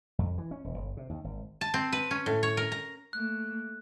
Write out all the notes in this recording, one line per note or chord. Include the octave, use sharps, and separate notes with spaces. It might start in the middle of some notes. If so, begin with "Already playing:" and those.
F2
E3
C#4
E1
G1
C3
D#2
G#1
A5
C4
B4
C#4
A2
C#5
A#4
A#5
A3 A#3 F#6